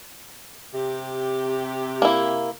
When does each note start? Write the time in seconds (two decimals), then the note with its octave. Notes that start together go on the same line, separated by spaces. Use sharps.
0.75 C3 G4
2.02 A#3 E4